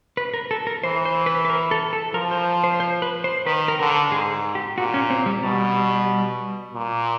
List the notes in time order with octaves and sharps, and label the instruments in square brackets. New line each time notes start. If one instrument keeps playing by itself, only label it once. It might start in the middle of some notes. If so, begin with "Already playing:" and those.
[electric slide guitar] B4
A#4
A4
A#4
[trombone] E3 [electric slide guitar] C5
[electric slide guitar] C5
B4
B4
A#4
A4
A4
[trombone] F3 [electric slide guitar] A#4
[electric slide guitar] C5
C5
C5
B4
C5
[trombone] D#3 [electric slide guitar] B4
[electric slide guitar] A#4
[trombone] D3 [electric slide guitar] A#4
[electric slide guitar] A4
[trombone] G#2 [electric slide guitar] G#4
[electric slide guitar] G4
[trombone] A#2 [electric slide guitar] F#4
[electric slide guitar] C#4
C4
G3
[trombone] B2 [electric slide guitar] G3
[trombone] A#2